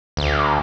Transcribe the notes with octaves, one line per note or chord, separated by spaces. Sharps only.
D2